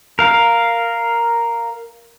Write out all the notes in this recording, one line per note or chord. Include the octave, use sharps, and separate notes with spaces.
A#4 F5